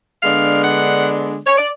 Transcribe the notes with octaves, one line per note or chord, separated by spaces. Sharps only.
D3 G#3 B3 D4 F5
F#5
C#5
D5